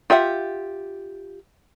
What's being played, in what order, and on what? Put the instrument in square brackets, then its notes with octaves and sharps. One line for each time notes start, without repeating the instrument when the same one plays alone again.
[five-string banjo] F4 G4 E5 F#5